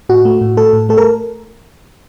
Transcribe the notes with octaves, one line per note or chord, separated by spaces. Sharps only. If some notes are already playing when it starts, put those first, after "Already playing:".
A2 F#4
A3
A2
A3 A4
A2
A3 A4
A#4